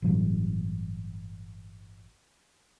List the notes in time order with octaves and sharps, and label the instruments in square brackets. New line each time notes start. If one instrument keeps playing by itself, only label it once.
[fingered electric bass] G1 A2 E3 F#3